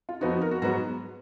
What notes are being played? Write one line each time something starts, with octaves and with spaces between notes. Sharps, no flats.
F4
F2 F3 B3 D#4 F#4
F#4
A#4
F#4
G#2 F#3 B3 F#4